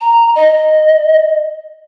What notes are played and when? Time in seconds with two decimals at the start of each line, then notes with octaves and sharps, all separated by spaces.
0.01 A#5
0.36 D#5